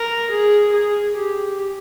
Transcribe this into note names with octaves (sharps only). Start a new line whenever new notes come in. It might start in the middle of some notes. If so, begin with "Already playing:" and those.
Already playing: A#4
G#4
G#4
G4